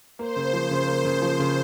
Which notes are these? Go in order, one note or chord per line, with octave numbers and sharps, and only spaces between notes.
A#3 C5
C#3
F3
C#3
A#3
C#3
F3
C#3